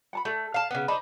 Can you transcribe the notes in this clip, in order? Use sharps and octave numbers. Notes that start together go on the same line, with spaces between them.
F#5 A5 B5
A3 A4
F5 A5
C#3 B3
D4 D#4 C5 B5